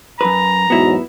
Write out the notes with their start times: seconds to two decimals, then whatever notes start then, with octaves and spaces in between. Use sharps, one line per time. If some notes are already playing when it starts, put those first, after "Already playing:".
0.21 F#2 B4 A#5
0.70 E2 G#2 F#3 B3 E4